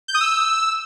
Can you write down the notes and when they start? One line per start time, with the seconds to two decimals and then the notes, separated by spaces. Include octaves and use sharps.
0.08 G6
0.14 D#6
0.21 E6